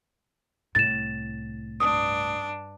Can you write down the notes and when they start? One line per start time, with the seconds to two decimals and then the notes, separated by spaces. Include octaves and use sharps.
0.75 C2 A2 A6 E7
1.80 G2 D4 D#6